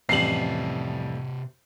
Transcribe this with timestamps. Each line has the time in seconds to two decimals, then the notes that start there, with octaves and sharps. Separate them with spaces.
0.09 A1 F2 C3 G3 D#5 C7 F#7